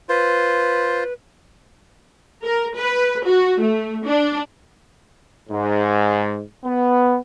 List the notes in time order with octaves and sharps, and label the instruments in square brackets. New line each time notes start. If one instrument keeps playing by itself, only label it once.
[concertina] F4 C5 [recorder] B4
[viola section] A#4
B4
F#4
A3
D4
[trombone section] G#2
B3